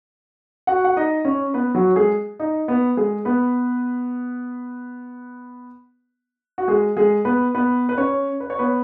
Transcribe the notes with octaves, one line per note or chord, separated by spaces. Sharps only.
F#4 F#5
F#5
D#4 D#5
C#4 C#5
B3 B4
F#3 F#4
G#3 G#4
D#4 D#5
B3 B4
G#3 G#4
B3 B4
F#4
G#3 G#4
G#3 G#4
B3 B4
B3 B4
B4
C#4 C#5
B4
C#5
B3 B4